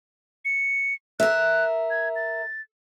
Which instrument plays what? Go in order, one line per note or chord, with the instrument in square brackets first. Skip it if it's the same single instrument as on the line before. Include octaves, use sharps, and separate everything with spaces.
[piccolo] C#7
[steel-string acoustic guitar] A#4 E5 [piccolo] F#6
[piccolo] G#6
A6